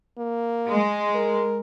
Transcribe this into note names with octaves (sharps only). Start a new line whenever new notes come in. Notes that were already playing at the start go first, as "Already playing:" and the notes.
A#3
G#3
A#4